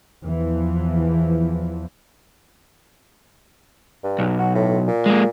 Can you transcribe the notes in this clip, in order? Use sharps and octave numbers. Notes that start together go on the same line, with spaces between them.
E2 E3 F3
G2
B1
F#4
A2
A#2
G#3 A#3